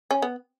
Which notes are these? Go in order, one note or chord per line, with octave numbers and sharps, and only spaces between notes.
C#4
B3